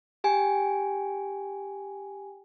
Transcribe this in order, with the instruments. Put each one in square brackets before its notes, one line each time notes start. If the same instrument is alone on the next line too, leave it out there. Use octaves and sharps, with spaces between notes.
[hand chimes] G4 G5 G#5